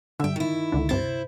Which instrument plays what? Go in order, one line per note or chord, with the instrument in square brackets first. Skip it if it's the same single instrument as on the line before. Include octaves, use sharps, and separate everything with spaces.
[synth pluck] G2 D3 [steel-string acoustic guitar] E5 G5
[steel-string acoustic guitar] D#3 E4
[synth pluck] C#2 D3
[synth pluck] G2 C3 A6 [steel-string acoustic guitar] E4 C5